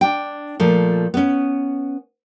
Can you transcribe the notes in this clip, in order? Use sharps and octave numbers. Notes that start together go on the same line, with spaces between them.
D4 G5
A#2 F3 A3
B3 C#4